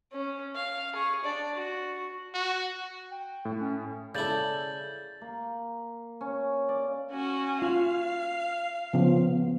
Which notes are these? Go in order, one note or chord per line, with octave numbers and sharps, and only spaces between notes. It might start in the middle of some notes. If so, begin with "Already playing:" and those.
C#4
F5
G#4 C#6
D4 D5
F#4
F#4
G5
A2
C#4
C#3 E4 A4 D5 G6 A6 F#7
A#3
C#4
D5
C#4 F#4 G#5
F4 F5 F6
C#3 F3 B3